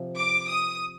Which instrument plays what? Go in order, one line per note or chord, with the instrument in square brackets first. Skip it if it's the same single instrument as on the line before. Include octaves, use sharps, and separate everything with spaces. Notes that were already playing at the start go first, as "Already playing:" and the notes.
Already playing: [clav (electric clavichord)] C3 F3
[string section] D6
D#6